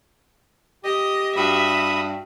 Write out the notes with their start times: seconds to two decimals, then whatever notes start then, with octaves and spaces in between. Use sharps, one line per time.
0.84 G4 D#5
1.36 G2 F#4 E5 B5 D#6